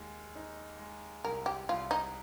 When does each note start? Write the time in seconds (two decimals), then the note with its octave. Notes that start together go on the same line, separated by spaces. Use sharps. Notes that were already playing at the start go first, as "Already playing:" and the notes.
Already playing: D#2 G#3
0.35 D#4
0.79 G#3
1.24 C2 A#4
1.46 G4
1.69 C2 F4
1.91 D#4